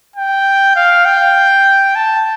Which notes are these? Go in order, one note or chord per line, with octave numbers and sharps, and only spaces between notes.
G5
F5
G5
A5